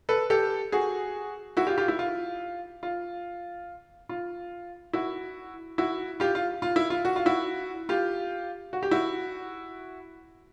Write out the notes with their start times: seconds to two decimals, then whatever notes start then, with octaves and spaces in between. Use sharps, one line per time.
0.09 A4 B4
0.30 G4 A4
0.72 F#4 G#4
1.57 E4 F#4
1.67 F4 G4
1.78 F4 G4
1.88 E4
1.99 F4
2.83 F4
4.09 F4
4.93 E4 F#4
5.78 E4 F#4
6.20 F4 G4
6.35 F4
6.62 F4
6.76 E4
6.90 F4
7.05 F#4
7.16 F4
7.26 E4 F#4
7.89 F4 G4
8.73 F#4
8.83 G4
8.91 E4 F#4